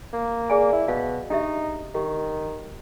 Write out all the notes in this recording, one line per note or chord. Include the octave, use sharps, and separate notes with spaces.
A#3
G#4 D5 G#5
E4
B2 F5
D4 D#4 G4 E5
D#3 G4